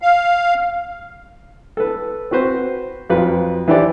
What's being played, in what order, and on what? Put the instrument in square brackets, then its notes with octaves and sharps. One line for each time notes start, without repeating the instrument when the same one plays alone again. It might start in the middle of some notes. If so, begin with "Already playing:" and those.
[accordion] F5
[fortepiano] A4 B4
C4 F#4 B4 C5
F2 F#3 F4 B4
E3 D4 E4 G4 C5 D5